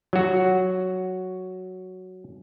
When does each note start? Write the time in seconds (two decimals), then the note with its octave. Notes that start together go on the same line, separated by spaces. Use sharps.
0.13 F#3 F#4